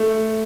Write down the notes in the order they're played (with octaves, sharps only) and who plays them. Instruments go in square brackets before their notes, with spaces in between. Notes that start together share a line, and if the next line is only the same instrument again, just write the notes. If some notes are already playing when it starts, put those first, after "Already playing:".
Already playing: [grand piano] A3